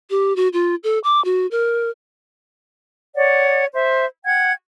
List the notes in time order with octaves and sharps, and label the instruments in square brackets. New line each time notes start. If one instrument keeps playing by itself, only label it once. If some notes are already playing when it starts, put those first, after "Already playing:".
[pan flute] G4
F#4
F4
A4
D6
F#4
A#4
[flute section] C#5 D5 F#5
C5 E5
F#5 G5 G#6